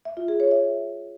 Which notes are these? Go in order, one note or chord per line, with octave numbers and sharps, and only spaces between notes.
E5
F4
G#4
C#5
E5